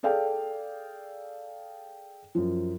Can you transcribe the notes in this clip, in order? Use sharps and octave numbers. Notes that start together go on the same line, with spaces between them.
G#4 A4 D5 F5 G5
F#2 F3